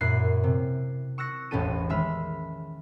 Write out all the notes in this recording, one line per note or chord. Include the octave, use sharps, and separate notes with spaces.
F#2 A#2 E4 F#6 C7
C3
C#6 E6 F#6 A#6 C#7
E1 A1 C#4 G4 A4 D#7
D#3 G#3 E5 B5 F6